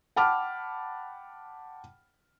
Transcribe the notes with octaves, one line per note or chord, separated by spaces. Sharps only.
F#5 G5 A5 B5 D6 F6